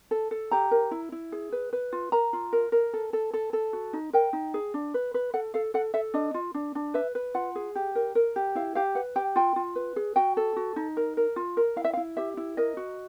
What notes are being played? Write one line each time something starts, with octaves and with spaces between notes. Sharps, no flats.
A4
A4
G4 A#5
A#4
E4
E4
G#4
B4
B4
F4
A#4 A#5
F4
A#4
A#4
A4
A4
A4
A4
F#4
D#4
A#4 G5
D#4
G#4
D4
B4
B4
A4 F#5
A4 F5
A4 F#5
A4 E5
D4 D#5
F4
D4
D4
B4 E5
B4
F4 F#5
G#4
G4
A#4
A#4
G4
E4 F5
G4 F5
B4 F#5
G4 G5
F4 G5
F4
B4
G#4
F#4 G5
A4
F#4
D#4
A#4
A#4
F4
A#4
E4 F5
E5
F5
E4
G4 E5
E4
A#4 D#5
F#4